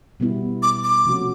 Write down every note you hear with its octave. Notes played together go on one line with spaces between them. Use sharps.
B2 G3 B3 E4
D6
D6
C3 F3 A3 C#4 F#4